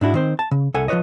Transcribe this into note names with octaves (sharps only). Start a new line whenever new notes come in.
G#2 D4 E4 F#4
D#3 C4 C5
A5
C#3
C2 A4 F#5 G#5
F3 F4 G4 B4 C#5 D#5